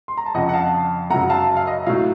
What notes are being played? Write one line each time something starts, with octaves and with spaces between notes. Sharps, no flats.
C6
A#5
A5
F2 C#3 F3 D#5 F#5
F#5
F5 A5
F#2 C#3 F#3 F#5 A#5
F5 A5
F5
D#5
A2 F#3 F5